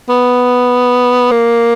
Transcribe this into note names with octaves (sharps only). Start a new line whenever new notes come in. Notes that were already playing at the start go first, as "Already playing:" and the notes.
B3
A#3